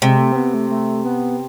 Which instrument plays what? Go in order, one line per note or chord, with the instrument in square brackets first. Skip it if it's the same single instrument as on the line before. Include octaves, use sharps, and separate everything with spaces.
[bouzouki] C3 [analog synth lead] G#3
[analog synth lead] A3
C4
B3
A3
A3
B3